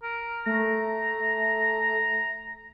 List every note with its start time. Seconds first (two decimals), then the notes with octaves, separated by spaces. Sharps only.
0.03 A#4
0.46 A3 A#5